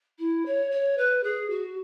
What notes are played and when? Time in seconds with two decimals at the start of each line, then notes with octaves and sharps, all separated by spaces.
0.19 E4
0.45 C#5
0.71 C#5
0.97 B4
1.23 G#4
1.50 F#4